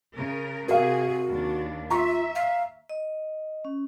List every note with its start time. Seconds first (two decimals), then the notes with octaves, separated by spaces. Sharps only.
0.14 C#3 A#4
0.68 C3 F#4 G#4 A#4 F5
1.28 D#2 D4
1.90 F4 E5 A#5 C#6
2.35 F5
2.89 D#5
3.65 C#4